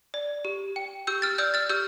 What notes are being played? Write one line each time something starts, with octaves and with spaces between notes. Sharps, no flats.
D5
G4
G5
G4 E6 G6
F6 A6
D5 E6 G6
F6 A6
G4 E6 G6